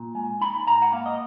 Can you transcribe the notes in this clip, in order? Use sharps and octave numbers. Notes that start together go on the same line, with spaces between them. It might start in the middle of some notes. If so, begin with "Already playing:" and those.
Already playing: A#2
G#3
D#4 B5
G#2 A#5
F#5
A#3 F5
D#5